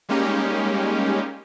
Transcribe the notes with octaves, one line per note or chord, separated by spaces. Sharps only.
G3 G#3 A#3 C#4 D#4 G4